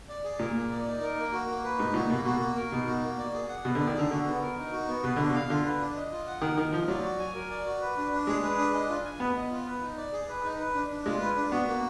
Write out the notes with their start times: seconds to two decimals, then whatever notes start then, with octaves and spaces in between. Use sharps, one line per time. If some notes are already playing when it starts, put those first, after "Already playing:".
0.09 D5
0.24 G#4
0.39 A#2 A#4
0.55 A#3
0.71 D5
0.87 D#4
1.02 A#4
1.17 A#3
1.32 F#4
1.48 A#3
1.64 B4
1.79 G#2 D#4
1.94 A#2 F#4
2.10 B2 A#3
2.25 B2 F#4
2.40 A#3
2.56 A#4
2.72 B2 D#4
2.87 F#4
3.03 A#3
3.18 D5
3.34 G#4
3.49 F#5
3.64 B2 B4
3.75 D3
3.80 D5
3.87 D#3
3.95 D3 G#4
4.11 D3 F#4
4.26 B3
4.41 A#4
4.57 D#4
4.72 F#4
4.88 B3
5.03 B2 B4
5.17 D3 D4
5.30 B2
5.34 F5
5.50 D3 F4
5.65 B4
5.81 D4
5.96 D#5
6.11 F4
6.27 F#5
6.42 D#3 A#4
6.57 D#3 D#5
6.73 F3 F4
6.88 F#3 D5
7.04 F#4
7.20 G#5
7.34 A#4
7.50 D5
7.66 F#4
7.81 B4
7.97 D4
8.12 D4
8.27 G#3 G#4
8.43 B4
8.58 D4
8.74 D#5
8.89 F4
9.05 G#5
9.20 B3 B4
9.36 D#5
9.51 F4
9.67 B4
9.82 D#4
9.97 D5
10.13 G#4
10.28 B4
10.44 D#4
10.59 B4
10.75 D4
10.90 D4
11.05 G#3 F4
11.21 B4
11.36 D4
11.52 B3 F#4
11.67 A#3